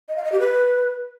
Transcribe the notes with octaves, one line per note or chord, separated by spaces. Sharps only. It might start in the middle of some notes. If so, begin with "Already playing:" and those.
D#5
F5
D#5
G4
B4